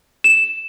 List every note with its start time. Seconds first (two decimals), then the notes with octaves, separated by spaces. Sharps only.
0.24 E7